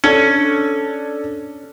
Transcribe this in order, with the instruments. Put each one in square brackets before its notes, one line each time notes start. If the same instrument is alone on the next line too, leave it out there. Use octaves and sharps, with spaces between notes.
[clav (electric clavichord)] C#4 [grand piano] D4 A4